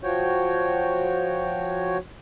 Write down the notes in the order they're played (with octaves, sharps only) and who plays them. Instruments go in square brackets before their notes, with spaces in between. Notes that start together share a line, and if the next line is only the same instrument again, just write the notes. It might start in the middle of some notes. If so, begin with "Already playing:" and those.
[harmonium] F3 F#4 C#5 G5